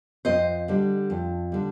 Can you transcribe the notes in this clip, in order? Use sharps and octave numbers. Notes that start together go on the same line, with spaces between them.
F2 C5 D#5
D3 G3
F2
D3 G3